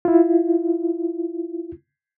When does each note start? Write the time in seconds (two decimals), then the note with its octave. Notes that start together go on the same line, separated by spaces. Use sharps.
0.05 E4 F4